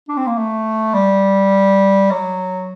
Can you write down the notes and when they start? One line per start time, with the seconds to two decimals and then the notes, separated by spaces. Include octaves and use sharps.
0.08 D4
0.17 C4
0.27 A#3
0.38 A3
0.94 G3
2.11 F#3